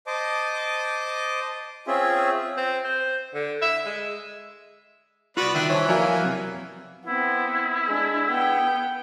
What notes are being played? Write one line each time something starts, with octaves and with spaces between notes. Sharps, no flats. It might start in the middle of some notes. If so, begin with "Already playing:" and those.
C5 D#5 A5 D6
C4 C#4 F4 G#4 E5
C4
C5
D3
E5
G#3
C2 B3 F4 F#4 B4 D5
D#3 D4 E5
E3 C5 C#5 E5 A5
F3 A#3 F#4 A#4 C#5 D5 G#5
F#2 C3
B3 C4 E4
G#3 D4
B3 G5